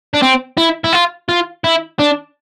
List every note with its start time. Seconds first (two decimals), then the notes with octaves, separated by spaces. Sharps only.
0.14 D4
0.22 C4
0.57 E4
0.84 E4
0.93 F4
1.29 F4
1.64 E4
1.99 D4